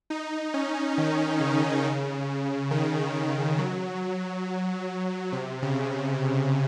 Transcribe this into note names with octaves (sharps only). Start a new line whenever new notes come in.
D#4
C#4
D#3
C#3
C#3
D#3
D#3
F#3
C3
C#3